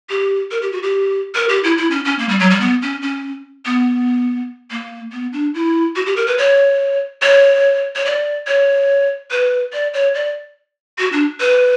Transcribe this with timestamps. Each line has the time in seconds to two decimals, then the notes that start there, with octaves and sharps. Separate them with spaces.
0.10 G4
0.51 A#4
0.62 G4
0.72 F#4
0.83 G4
1.35 A#4
1.49 G4
1.64 E4
1.78 E4
1.91 C#4
2.05 C#4
2.19 A#3
2.29 G3
2.40 F#3
2.50 G3
2.61 B3
2.82 C#4
3.02 C#4
3.66 B3
4.71 A#3
5.12 B3
5.33 D4
5.54 E4
5.96 F#4
6.06 G4
6.16 A#4
6.27 B4
6.38 C#5
7.22 C#5
7.96 C#5
8.06 D5
8.47 C#5
9.31 B4
9.73 D5
9.94 C#5
10.15 D5
10.99 F#4
11.13 D4
11.40 B4